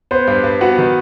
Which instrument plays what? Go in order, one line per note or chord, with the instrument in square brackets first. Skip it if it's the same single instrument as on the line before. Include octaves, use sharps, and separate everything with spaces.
[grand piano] B3 [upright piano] C5
[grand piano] G2
G2
[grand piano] B3 [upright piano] F#4 F#5
[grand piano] D#3